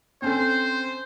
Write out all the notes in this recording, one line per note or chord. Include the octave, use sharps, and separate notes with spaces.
C4 C#4 A4 C5